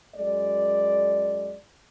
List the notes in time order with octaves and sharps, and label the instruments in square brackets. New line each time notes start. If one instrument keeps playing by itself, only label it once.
[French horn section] F#2 G#3 D5